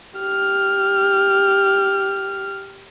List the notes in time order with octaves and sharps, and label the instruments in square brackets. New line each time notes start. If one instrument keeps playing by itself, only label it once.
[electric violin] G4 F6